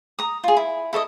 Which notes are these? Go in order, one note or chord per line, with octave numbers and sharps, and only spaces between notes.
A#5 D#6
F4 G#4
E4
E4 A4 D5 D#5